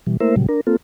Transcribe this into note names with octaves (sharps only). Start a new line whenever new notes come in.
B2 E3 G3
A3 A#3 E4 A#4 C5 E5
A#2 C#3 F#3 G3
D4 A#4
A#3 C4 F4 A4